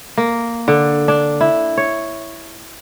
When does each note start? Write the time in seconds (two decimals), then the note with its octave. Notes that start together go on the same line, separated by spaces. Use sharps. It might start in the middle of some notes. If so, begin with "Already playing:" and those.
0.17 A#3
0.68 D3
1.08 D4
1.41 E4
1.77 C#5